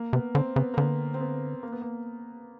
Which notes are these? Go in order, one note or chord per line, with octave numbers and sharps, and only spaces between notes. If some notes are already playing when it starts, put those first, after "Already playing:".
Already playing: A#3
C3 B3
D3 C4
C#3 B3
A#3
D3 B3
C4
B3
A#3
B3
A#3